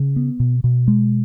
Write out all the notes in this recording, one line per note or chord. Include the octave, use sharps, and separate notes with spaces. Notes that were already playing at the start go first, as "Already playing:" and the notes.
Already playing: C#3
B3
B2
B2
G#3